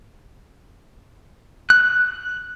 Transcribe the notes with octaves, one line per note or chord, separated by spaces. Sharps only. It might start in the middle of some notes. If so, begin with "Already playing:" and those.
F#6